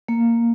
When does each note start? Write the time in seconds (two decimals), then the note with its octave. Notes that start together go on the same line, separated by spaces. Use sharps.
0.09 A#3